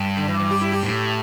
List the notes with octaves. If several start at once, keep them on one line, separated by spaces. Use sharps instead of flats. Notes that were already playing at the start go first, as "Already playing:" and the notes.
Already playing: G2
D3
E3
E3
G4
E4
G4
A2